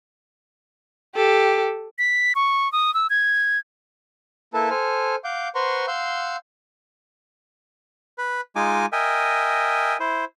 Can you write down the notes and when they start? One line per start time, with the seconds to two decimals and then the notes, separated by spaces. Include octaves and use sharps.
1.15 G4 A4
1.99 B6
2.35 C#6
2.73 D#6
2.94 E6
3.10 G#6
4.54 A#3 E4 A4 B4 A5
4.70 A4 C5 G#5 F6
5.24 F5 F#5 D6 G6
5.55 B4 C5 F#5 A#5 C6 C#6
5.88 F5 F#5 C6 E6 G6
8.18 B4
8.56 G#3 D#4 F4 G#5 D6
8.92 A#4 D#5 E5 G5 G#5
10.00 E4 C5